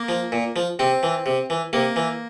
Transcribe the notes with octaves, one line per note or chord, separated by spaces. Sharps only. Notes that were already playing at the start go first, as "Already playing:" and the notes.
Already playing: A#3
F3
A#2
F3
C3 C4
E3
C3
E3
C3 A#3
E3